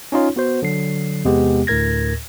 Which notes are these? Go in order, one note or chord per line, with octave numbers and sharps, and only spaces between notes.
C#4 D#4 F4 C#5
B3 F#4 C5
D3 F#3 C7
E2 C3 G#3 B3 G4
D2 A2 A#4 G#6 A#6